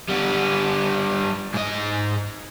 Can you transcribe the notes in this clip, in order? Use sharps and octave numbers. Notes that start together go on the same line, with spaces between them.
G3 B3
G#2 D#5